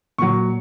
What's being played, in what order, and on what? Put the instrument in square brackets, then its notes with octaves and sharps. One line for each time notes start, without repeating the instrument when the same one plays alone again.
[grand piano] A#2 F#3 C#6